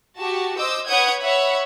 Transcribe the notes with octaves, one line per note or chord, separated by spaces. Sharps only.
F#4 G4 A5
C5 D#5 D6 E6 G6
B4 C#5 F#5 D#6 G6 G#6
C#5 E5 F#5 B5